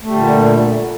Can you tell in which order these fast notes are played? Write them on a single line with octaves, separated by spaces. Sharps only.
A3 G3 D3 A#2